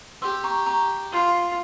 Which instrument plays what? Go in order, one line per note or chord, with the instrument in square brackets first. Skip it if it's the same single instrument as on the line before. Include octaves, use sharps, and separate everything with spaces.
[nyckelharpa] G4 [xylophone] C6 E6
[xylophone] A#5 C#6
A#5 C#6
[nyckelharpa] F4